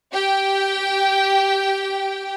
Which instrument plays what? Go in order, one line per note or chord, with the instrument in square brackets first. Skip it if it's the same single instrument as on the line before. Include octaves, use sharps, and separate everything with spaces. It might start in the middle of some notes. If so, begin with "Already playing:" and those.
[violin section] G4 G5